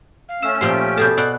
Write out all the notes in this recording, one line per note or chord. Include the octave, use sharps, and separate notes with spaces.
F5
A3 C#4 E6 E7
A#2 F3 G4 C6
B2 G#4 A4 A5 G6
B2 D5 E5 F#6